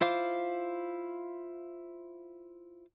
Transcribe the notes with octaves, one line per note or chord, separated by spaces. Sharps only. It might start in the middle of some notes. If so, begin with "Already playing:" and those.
E4 F4 C5 F5 D6